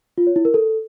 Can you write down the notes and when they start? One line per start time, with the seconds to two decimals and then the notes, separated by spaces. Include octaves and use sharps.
0.18 F4
0.27 C#5
0.36 E4
0.45 A#4
0.54 A4